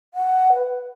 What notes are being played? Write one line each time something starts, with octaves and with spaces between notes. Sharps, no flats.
F#5
B4